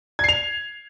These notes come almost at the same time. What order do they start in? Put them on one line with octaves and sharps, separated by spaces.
G#6 C7 F7